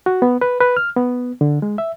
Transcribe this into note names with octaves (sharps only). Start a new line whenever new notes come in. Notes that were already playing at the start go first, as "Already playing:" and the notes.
F#4
B3
B4
B4
F6
B3
D3
G#3
E5